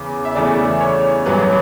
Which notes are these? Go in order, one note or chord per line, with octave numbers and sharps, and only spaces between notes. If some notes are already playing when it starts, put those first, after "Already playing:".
Already playing: E2 C#3 E3
E5
E2 C#3 E3 A3 D5
C#5
A1 G2 F#3 B4